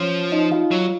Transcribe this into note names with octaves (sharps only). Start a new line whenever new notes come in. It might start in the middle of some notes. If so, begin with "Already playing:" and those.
Already playing: F3 C#4 C#5
D#4 D#5
F4 F5
F#3